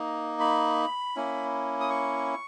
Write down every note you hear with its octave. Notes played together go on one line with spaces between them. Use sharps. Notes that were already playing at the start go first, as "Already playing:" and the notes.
Already playing: A#3 D#4
B5
A#3 C#4 E4
D#6
C#6